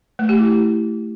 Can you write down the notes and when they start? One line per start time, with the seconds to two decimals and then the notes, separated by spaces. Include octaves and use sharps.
0.19 A3
0.29 G4
0.39 E4